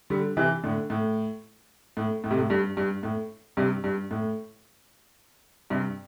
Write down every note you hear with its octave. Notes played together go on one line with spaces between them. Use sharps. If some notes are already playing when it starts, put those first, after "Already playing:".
D3 G3
C3 E3
A2 D3
A2
A2
A2
C3
A2
G2
G2
A2
G2 C3
G2
A2
G2 C3